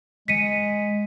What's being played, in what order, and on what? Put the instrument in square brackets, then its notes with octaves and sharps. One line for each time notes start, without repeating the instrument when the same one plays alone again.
[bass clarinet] G#3 [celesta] B6 C#7 D#7